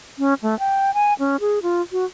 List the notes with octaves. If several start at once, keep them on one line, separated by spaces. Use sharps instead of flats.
C#4
A3
G5
G#5
C#4
G#4
F4
F#4